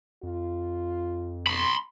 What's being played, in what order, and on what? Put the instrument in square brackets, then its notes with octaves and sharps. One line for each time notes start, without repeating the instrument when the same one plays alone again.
[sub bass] F2 [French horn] F4
[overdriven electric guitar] B5 C6